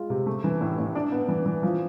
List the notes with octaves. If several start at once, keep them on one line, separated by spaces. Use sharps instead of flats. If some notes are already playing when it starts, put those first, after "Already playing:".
Already playing: G#3 F4
C3
A3
E3
A2
A2
D4
B3
E3
E3
F3